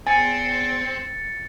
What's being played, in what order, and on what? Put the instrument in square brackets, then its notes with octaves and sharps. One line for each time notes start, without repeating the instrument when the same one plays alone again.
[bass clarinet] E2 [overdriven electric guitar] C4 [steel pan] G#5 [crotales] A6 C#7